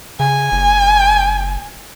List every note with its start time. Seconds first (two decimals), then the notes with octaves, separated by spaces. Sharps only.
0.20 C#3 G#5
0.52 F#1